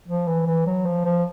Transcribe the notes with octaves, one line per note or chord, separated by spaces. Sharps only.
F3
E3
E3
F#3
F3
F3